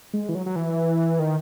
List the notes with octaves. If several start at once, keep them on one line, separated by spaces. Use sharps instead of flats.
G#3
E3
F#3
F#3
E3
D#3